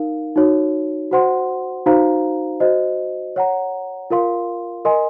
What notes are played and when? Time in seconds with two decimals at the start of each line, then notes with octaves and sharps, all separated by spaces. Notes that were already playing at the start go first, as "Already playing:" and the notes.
Already playing: D#4 A#4 F5
0.36 D#4 F#4 C#5
1.11 F#4 C5 F#5 C6
1.86 D#4 F#4 C5 F5 A#5
2.60 F#4 C5 D#5
3.36 C#5 F#5 A#5
4.10 F4 A#4 F5 C6
4.85 A#4 D#5 G#5 C6